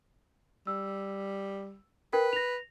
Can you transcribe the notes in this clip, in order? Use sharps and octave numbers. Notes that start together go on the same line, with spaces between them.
G3 E6
A#4 B4 G5
A#6 F7